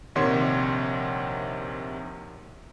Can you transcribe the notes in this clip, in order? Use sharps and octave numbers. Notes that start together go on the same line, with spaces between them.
A#1 C3 D#3 C#5 F#5 C6